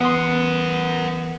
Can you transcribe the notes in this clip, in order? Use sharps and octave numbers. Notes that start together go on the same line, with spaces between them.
E2 B3 A#4 B4 F#5 C6 D#6